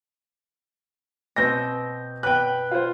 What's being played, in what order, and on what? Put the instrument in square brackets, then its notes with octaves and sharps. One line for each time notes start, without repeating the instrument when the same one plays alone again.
[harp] B2 C4 [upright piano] G6 A#6
[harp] B4 [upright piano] G5 F#6
[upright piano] F4 C5